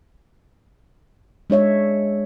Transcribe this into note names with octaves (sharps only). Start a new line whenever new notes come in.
G#3 D4 C#5 E5